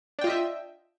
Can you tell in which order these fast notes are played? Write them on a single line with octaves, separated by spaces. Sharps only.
D4 G5 F4 D#5 E5